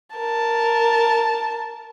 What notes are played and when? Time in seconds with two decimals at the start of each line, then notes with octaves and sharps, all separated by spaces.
0.16 A#4 A5